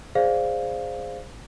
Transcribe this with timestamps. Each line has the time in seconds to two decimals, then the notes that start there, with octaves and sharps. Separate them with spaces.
0.15 G#4 C5 D5 F5